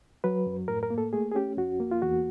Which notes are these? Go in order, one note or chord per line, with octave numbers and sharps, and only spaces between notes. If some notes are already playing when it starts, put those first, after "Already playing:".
F#3 B4
F#2
A2 A#4
A#4
A#3
A4
A3 G#4
G#4
C#4 G4
F2 F#4
A#3
F4
E2 F#4